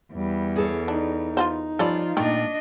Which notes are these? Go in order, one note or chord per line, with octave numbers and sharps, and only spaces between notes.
E2 G3
G#4 A4 C#5
D4 D#4
F4 F#4 C5
F3 G3 C#4 F4 A4 D5
A#2 D#3 A3 D4 D#5 G5